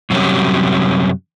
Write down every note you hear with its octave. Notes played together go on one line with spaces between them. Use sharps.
F#2 C3 F#3 G3 C#4